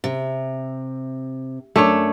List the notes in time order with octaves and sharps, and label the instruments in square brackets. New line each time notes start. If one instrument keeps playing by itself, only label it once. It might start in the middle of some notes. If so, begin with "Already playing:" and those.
[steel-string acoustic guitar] C3
[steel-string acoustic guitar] F#2 [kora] A3 D4 C#5